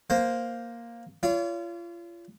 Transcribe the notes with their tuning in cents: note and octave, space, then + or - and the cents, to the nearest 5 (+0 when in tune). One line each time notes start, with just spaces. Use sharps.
A#3 +5 C5 +0
F4 -30 C#5 +40